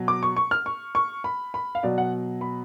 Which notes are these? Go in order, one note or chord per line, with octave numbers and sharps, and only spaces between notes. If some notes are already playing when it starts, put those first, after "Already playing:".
Already playing: B2 F#3
D6
C#6
C#6
F6
C#6
C#6
B5
B5
F5
B2 F#3 D5
F#5
B5